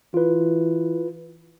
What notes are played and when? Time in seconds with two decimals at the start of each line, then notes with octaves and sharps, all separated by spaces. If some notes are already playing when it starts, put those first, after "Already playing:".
0.14 E3 F4 B4